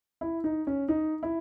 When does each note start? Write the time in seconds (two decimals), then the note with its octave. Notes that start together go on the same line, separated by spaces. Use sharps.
0.21 E4
0.44 D#4
0.67 C#4
0.88 D#4
1.23 E4